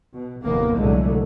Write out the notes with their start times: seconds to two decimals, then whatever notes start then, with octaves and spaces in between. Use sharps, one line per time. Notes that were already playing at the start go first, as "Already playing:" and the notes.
0.13 B2
0.44 F1 D#2 A2 A#3 B3
0.76 C2 A#2 D3 F#3 G#3 A3